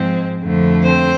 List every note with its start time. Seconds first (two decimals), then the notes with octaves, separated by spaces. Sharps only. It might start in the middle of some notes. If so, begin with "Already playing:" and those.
Already playing: G#2 F3 G#3 C4
0.42 F2 D3 F3 A3
0.83 C4 C5